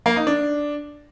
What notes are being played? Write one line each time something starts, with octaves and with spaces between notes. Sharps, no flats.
A#3
D#4
D4